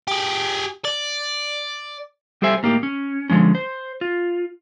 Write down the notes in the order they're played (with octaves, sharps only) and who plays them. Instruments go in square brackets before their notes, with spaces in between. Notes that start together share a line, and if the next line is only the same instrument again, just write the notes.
[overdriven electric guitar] G4 G#4
D5
[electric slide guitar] G3 G4 A4 C5 E5 G#5
A2 A#3 D#4 G4
C#4
D3 F3 G#3 C#4
C5
F4